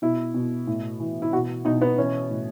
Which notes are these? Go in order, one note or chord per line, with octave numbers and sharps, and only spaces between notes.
B2 E4
B2
A2
E3
E4
B2 F#4
B2 D#4
B3
E3 C#4
A2